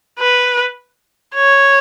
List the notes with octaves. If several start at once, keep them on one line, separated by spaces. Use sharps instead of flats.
B4
C#5